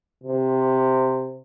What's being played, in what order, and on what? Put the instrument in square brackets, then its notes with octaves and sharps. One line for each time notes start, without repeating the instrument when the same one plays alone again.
[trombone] C3